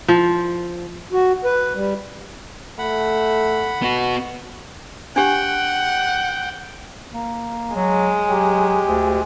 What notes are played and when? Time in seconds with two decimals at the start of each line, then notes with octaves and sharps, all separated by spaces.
0.08 F3
1.12 F#4
1.44 B4
1.75 G3
2.79 A3 F#5 B5
3.82 B3 F#4
5.16 D4 G4 F#5 G5
7.14 A#3
7.75 F#3 G#3
8.28 F#3 G4
8.85 D2